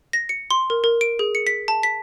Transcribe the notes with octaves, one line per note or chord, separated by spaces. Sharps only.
A#6
C#7
C6
A#4
A#4
D7
G#4
C#7
B6
A5
B6